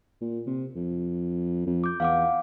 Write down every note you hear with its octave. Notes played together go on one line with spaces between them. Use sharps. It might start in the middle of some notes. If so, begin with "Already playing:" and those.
A#2
C3
F2
F2
D6 G6
E2 F5 F#5 D6